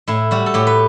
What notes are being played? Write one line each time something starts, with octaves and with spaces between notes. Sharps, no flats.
A2 E4
G3 F#4
A4
A2 G4
B4